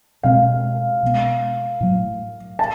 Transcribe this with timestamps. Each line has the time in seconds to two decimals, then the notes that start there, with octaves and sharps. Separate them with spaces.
0.23 B2 G#3 C4 F5
1.03 B2 G#3 B3
1.80 A2 F#3 A3
2.59 A5